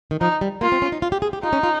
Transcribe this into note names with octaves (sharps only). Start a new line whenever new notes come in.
D#3
F3 D#4
G3
A#3 F4
C4
C#4
D#4
F4
G4
G#4
G4
D#4 F4
C#4
F4